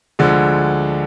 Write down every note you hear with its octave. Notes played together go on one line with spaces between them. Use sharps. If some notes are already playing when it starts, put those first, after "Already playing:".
D2 D3 F3 G#3